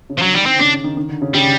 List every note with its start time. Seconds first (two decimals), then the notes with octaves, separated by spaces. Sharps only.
0.10 C#3
0.18 F3
0.22 D3 F#3
0.34 D#3 G3
0.46 C4
0.59 C#3 D4
0.84 D#3
0.97 D#3
1.09 D3
1.22 C#3
1.34 C#3 G3